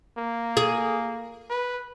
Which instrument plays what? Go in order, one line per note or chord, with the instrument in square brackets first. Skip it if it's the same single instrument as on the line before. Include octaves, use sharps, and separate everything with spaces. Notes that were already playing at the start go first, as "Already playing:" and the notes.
[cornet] A#3
[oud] G#4
[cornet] B4